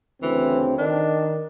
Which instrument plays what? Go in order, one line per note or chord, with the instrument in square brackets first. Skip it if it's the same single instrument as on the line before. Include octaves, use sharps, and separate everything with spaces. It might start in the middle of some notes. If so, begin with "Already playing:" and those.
[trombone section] D2 C#3 C4 [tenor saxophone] E3
[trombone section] D#3 [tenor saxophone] D4